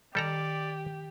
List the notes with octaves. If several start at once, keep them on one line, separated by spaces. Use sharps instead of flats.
D#3 G3 G4 A4 D5 A#5